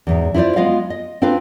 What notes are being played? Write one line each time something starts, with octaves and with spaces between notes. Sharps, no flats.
E2 G#2 E5
E4 F4 G#4 C5 D5
G#3 B3 F4 D#5 F5
D#5
C4 D4 F4 B4 C5